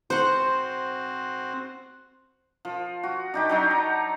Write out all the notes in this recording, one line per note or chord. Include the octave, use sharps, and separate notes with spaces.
C4 F#4 C5 F#5
F3
F#4
D4 D#4 G4
F#3 D4 D#4
A#5